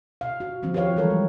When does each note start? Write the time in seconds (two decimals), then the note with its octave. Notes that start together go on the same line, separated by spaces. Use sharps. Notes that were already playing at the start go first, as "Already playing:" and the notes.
0.21 B2 F5
0.40 F#4
0.62 D#3 F3 F#3 C4
0.74 G4 B4 C#5 F5
0.96 E3 G3 G#3 A4 A#4 C#5
1.10 G3